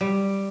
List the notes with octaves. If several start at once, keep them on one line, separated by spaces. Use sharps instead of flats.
G3